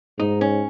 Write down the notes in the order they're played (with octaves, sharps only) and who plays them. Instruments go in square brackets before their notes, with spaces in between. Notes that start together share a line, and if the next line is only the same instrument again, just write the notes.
[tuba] G#2 [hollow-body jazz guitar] D#4
[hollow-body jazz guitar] C#4